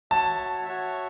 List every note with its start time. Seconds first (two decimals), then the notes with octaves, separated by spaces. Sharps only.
0.11 F#4 C#5 E5 A5
0.65 F#4 C#5 E5